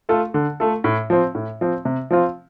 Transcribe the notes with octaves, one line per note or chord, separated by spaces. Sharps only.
A3 F4 A4
D3
A3 F4 A4
A2
F3 C4
A2
F3 C4
C3
F3 C4 F4